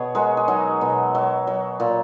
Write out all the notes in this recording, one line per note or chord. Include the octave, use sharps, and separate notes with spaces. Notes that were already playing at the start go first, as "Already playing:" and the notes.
Already playing: B2 G#4 C#5
G#3 F#4 A#4
G#4
F#3 D#4 F#4
B2
F#3
F#3
A#2